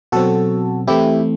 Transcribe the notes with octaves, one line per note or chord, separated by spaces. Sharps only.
B2 F#3 C4 F#4 A4
E3 A3 C4 E4 G4